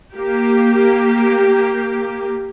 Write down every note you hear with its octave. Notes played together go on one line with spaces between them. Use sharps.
A#3 G4